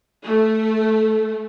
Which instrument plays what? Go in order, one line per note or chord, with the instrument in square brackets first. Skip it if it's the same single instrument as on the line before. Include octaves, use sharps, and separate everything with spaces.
[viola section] A3